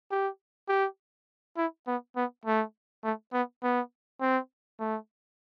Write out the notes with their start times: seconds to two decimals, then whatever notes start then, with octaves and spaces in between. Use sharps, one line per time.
0.11 G4
0.69 G4
1.57 E4
1.87 B3
2.16 B3
2.45 A3
3.04 A3
3.33 B3
3.63 B3
4.21 C4
4.79 A3